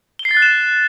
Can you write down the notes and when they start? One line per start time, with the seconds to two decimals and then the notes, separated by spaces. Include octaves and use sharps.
0.19 G7
0.25 C7
0.31 A6
0.37 F#6
0.42 E7